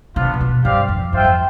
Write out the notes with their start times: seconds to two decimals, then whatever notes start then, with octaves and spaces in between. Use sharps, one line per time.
0.15 C3 B3 D4 F4
0.34 C3
0.40 B2
0.64 G2 C4 G4 D5 F5
0.88 F2
1.13 G2 F4 C5 E5 G5
1.24 F2